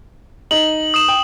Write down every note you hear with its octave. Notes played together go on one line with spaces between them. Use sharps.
D#4 F#7
D#6 E7
G5